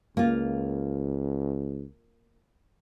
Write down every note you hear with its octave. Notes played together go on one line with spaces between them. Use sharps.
C#2 A#3 F4